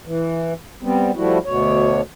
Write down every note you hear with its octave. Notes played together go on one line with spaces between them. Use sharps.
E3
G3 B3 C4
F3 G3 A3 E4 F#4
D2 B2 C#5